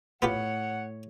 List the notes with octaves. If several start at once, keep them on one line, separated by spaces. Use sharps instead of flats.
A2 B3 F4 G4 C#5 F#5